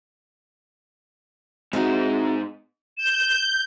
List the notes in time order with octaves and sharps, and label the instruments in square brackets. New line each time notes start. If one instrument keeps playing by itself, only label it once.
[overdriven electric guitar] G#2 D#4 [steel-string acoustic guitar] C4 E4 F#4
[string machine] G6 [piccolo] E7